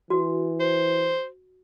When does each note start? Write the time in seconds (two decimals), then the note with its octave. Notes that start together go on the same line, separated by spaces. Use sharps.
0.10 E3 F#4
0.60 C5